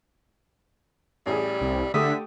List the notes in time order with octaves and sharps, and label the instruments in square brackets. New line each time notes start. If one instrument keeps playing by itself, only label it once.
[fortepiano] A1 G#4 [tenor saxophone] G3
[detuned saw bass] C2
[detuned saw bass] D3 [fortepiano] A3 G4 D#6 [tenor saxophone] E5